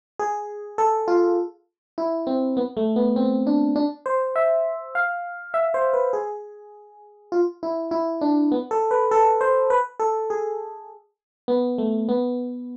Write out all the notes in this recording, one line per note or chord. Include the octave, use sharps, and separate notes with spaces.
G#4
A4
F4
E4
C4
B3
A3
B3
C4
D4
D4
C5
E5
F5
E5
C5
B4
G#4
F4
E4
E4
D4
B3
A4
B4
A4
C5
B4
A4
G#4
B3
A3
B3